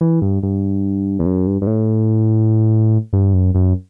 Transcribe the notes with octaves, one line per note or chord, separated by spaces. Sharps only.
E3
G2
G2
E2
F#2
G2
G2
A2
G2
F#2
F#2